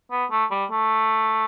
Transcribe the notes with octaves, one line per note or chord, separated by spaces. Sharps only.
B3
A3
G3
A3